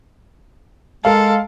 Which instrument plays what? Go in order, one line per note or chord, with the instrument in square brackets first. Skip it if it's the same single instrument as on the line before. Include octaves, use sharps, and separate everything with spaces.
[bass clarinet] G#3 [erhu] A4 [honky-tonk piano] A#4 F5